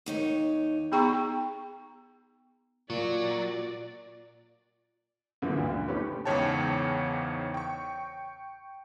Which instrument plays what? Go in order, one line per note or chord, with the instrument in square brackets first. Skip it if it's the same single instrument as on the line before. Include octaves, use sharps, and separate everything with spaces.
[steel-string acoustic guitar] D#2 D#4 C#5
[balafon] B3 D#4 G#4 G5 A#5 C#6
[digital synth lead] A#2 [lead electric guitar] F#3 [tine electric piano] F4 [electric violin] D5
[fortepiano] F#2 D3 E3 A#3 F4
D2 G2 A#2
A3 C#4 D#4 G4 B4
[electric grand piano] E2 G#2 C#3 C#5 G5 A5
G5 C#6